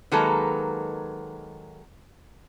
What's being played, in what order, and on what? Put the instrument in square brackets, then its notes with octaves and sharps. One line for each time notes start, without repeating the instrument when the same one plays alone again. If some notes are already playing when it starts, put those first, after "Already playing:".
[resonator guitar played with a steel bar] D#3 F#3 G#3 A#3 A4 B4